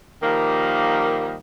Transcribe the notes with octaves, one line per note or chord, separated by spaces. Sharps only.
D#3 F3 G3 A#3